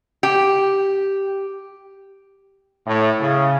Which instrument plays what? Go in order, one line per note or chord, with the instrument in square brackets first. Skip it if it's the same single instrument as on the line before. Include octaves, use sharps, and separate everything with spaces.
[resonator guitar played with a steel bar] G4
[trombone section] A2
C#3